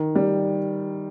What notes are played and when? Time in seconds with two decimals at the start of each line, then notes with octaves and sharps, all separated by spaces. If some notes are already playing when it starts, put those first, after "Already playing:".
Already playing: D#3
0.15 G3